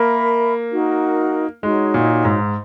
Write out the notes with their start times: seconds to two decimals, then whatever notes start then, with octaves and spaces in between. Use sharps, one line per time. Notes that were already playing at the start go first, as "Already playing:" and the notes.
Already playing: A#3 A#4 E5 B5
0.71 D#4 F#4 A#4
1.63 G#3 D#4 F#4 C#5
1.94 A#2
2.25 G#2